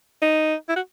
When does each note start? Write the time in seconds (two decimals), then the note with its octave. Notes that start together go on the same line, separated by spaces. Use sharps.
0.22 D#4
0.69 E4
0.76 F#4